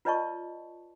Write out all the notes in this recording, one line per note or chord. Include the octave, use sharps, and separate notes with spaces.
F4 B4 D5 D#5 A5 C#6